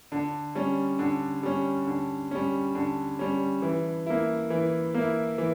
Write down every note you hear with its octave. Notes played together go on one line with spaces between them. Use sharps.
D3
G3 C#4
D3
G3 C#4
D3
G3 C#4
D3
G3 C#4
E3
A#3 E4
E3
A#3 E4
E3